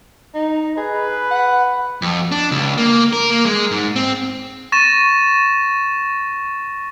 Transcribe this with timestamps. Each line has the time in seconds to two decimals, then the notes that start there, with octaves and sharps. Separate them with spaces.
0.34 D#4
0.77 G#4 B4
1.31 F#5
2.02 F2
2.32 D4
2.51 C#2
2.78 A#3
3.13 A#4
3.30 A#3
3.45 G#3
3.71 G#2
3.96 C4
4.72 C#6 A6 A#6 E7